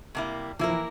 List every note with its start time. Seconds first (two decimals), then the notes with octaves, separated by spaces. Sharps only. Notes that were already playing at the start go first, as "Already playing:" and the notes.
0.15 C3 G3 A#3 E4
0.59 F3 A#3 E4 A#4
0.69 E3